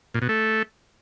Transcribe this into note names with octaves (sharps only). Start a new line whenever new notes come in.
A#2
B2
A3